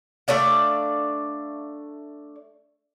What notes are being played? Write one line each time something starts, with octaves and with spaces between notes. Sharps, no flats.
A3 D4 D5 F5